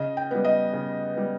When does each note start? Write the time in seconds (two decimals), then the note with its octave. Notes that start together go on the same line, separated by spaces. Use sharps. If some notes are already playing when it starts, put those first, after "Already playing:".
Already playing: C#3 D#5
0.17 G5
0.31 G3 B3
0.44 D#5
0.73 C#3
1.15 G3 B3